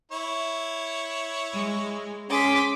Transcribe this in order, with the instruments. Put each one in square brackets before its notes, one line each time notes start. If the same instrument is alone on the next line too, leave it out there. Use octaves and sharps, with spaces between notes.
[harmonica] E4 C#5
[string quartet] G#3
[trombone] C#4 [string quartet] G#4 C6 [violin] D6 B6